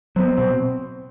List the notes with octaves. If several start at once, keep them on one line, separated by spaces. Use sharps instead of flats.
F#3 B3 C4
B2 C4